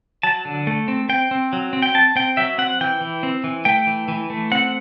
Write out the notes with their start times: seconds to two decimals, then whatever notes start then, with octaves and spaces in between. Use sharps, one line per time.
0.23 F#3 A5
0.45 D3
0.67 A3
0.88 C4
1.09 C4 G5
1.31 C4
1.53 F#3
1.73 C4
1.82 G5
1.95 C4 A5
2.16 C4 G5
2.37 F#3 E5
2.58 C4 F#5
2.81 E3 G5
3.01 E3
3.23 C4
3.44 E3
3.65 A3 G5
3.87 E3
4.08 E3
4.30 A3
4.52 C4 F#5